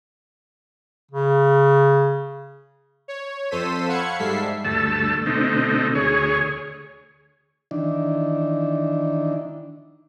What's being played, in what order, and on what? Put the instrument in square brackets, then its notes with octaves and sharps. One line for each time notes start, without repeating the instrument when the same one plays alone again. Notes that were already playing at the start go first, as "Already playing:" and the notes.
[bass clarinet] C#3
[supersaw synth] C#5
F2 A4 C5 E6 B6 D#7
F5 F#5 B5 C#6 G#6 C#7
G#2 G3 A4 E5 B6 C7
[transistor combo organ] D2 G2 A3 A5 E6
B2 D3 A3 C4 D#4
D2 G#4 C#5
D#3 E3 D4